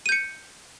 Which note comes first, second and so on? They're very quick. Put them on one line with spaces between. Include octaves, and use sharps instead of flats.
D#7 G6 C#7